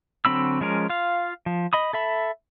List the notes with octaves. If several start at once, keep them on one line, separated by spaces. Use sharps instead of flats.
D3 F#3 C4 B5 E6
F3 G#3 C#4 A#4
F4 F5
F3
D#5 B5 D#6
A4 E5 B5